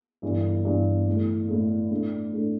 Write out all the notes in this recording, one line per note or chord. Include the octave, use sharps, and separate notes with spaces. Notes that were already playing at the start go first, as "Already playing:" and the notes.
G1 G2 E3
G1 G2 E3
A2 E3 A3
A2 E3 A3
A2 A3 D4
A2 A3 D4